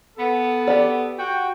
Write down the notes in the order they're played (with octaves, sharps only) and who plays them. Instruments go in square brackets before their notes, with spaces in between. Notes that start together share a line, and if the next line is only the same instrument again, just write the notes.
[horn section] B3 A4
[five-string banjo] G4 D5
[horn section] F#4 G5